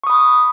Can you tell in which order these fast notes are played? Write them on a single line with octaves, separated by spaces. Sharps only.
C#6 D#6 B5